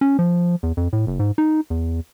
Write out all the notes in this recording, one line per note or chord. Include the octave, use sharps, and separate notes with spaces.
C#4
F3
E2
F2
A2
F#1
G#2
D#4
E2